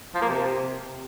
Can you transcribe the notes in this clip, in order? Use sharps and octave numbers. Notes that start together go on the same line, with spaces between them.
F3
A#3
C3